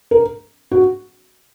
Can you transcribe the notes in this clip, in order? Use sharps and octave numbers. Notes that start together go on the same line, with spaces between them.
A#4
F#4